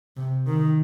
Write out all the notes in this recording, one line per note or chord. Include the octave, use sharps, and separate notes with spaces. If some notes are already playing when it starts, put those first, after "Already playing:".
C3
D#3